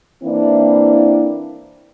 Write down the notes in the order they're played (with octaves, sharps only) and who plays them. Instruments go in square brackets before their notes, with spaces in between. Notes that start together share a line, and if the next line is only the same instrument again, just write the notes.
[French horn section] E3 A#3 C4 D4 E4